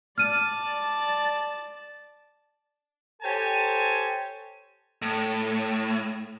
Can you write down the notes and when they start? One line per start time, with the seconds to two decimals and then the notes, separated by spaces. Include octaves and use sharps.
0.18 D5 A5 F6 D#7
3.22 G4 A4 C5 C#5 G#5 A5
5.02 A2